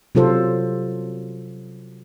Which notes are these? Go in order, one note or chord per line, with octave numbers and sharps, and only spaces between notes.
C3 F#3 F4 A4 C5